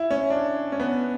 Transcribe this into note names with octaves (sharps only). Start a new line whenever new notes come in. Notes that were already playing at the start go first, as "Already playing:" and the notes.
Already playing: E4
C#4
D4
C#4
B3